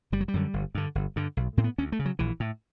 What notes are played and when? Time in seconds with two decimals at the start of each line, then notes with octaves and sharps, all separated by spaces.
0.12 F#1 G3
0.21 F#3
0.28 G3
0.34 F#2 D3
0.54 G1
0.75 G2 D3
0.95 G1
1.16 G2 D3
1.37 B1
1.57 A2 C4
1.64 B3
1.78 D2 C#4
1.92 A3
1.99 C#3
2.05 F#3
2.19 A#1 E3
2.40 A2